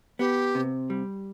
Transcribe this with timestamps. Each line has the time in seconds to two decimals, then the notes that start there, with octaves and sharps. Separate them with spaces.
0.19 B3 G4
0.55 C3
0.90 G3